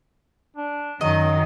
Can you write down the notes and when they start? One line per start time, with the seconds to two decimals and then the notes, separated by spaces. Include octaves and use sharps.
0.57 D4
1.01 F#2 D#3 F#3 D#5